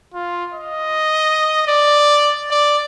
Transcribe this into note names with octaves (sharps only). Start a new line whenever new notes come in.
F4
D#5
D5
D5